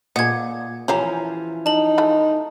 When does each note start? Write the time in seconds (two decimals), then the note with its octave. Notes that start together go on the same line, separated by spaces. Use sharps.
0.16 A#2 G#4 D#5 F#5 G#6
0.88 E3 F3 C#4 G4 F5 A#5
1.66 D#4 A5 F#7
1.98 G#3 A3 B5